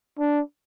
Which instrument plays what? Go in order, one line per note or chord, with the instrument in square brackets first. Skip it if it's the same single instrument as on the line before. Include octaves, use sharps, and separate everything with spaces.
[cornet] D4